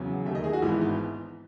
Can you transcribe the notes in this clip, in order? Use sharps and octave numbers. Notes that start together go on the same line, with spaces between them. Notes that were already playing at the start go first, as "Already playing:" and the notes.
Already playing: E2 C#3 F#3
D#2 D#3 A3 E5
D#5
G#4
F#4
G#1 G#2 E3 B3 E4
E4
D#4